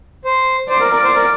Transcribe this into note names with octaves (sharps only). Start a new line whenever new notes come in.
C5
C5 D5
A#4
A#4
C5
A#4